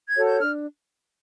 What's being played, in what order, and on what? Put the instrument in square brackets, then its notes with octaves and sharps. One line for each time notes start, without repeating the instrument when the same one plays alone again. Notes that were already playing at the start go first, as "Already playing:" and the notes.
[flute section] G#6
F#4 A4 C#5
G6
D4 F6